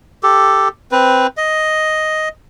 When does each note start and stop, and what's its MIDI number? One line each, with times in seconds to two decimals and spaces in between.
0.23 0.68 67
0.23 0.68 69
0.91 1.27 60
0.91 1.27 71
1.37 2.29 75